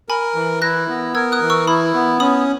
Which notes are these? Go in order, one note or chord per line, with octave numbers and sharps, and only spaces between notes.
A#4 G#5 B5
E3
E4 F#6 A#6
B3
A#4 E6 G#6
D#6 F#6
E3
C#6 E6
E4 B5 D#6
B3
C#4 B5 D#6